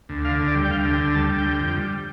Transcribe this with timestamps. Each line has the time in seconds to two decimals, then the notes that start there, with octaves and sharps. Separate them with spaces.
0.09 D2
0.25 D3 F5
0.40 D2
0.48 D5
0.55 G3
0.65 G5
0.71 D2 F5
0.85 D3
0.93 G5
1.01 D2
1.15 G3 A5
1.30 D2
1.38 G5
1.46 D3
1.61 F2
1.76 G3